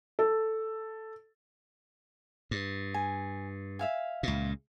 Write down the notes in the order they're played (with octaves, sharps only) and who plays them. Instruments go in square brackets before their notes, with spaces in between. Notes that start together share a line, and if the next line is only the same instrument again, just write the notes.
[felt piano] A4
[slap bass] G2
[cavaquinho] G#5
E5 F5 G#5
[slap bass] C#2 A#2